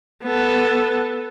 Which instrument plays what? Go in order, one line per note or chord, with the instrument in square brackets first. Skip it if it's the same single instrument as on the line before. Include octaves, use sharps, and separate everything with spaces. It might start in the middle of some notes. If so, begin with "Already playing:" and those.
[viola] B3 A4